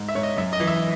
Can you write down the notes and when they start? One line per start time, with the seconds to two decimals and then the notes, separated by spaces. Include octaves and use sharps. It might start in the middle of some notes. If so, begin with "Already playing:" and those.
Already playing: G#2
0.08 E5
0.15 G#2 C#5
0.23 D#5
0.37 F#2 E5
0.53 D#5
0.60 E3
0.67 E5